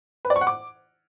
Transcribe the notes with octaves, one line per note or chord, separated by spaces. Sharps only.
B4
D5
C#6
F#5
D6